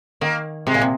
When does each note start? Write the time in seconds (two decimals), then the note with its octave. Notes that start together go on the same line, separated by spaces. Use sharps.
0.21 D#3 A#3
0.67 C3 G#3
0.74 A#2
0.82 C3